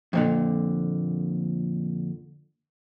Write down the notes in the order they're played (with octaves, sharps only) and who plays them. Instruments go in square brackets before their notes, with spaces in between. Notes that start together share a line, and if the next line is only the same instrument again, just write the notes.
[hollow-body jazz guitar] F2 A#2 D3